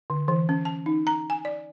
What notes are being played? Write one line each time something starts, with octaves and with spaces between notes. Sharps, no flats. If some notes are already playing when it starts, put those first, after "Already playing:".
D3
E3
C#4
A5
D#4
A#5
G#5
D5